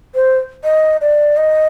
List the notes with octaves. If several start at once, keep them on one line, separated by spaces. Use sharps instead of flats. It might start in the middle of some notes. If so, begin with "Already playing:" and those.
C5
D#5
D5
D#5